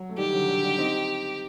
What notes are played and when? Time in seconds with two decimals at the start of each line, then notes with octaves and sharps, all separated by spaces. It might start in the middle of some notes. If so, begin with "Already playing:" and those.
Already playing: F#3
0.09 A3
0.18 D#3 G3 G4
0.33 D3 F#3
0.48 D3 F#3
0.63 D#3 G3
0.78 C4 D#4